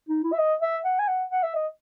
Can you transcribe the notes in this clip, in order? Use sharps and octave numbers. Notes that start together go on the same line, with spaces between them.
D#4
E4
E5
D#5
E5
F#5
G#5
F#5
F#5
E5
D#5